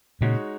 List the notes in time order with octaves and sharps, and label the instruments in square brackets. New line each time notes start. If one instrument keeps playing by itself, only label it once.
[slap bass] A#2 C#3 [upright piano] G#3 D#4 F#4 C#5